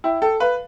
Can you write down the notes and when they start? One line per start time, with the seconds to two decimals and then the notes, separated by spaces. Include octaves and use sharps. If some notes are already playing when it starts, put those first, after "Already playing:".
0.04 E4 G5
0.21 A4 G5
0.40 B4 F5